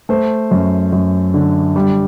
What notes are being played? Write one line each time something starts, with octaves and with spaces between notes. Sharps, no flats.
A3 C5
F#2
F#2
D3
G3